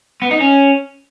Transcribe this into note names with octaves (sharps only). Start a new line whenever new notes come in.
B3
D#4
C#4